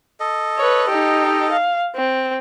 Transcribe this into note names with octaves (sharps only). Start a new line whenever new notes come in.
A4 D#5
B4 C#5
D#4 G4
F5
C4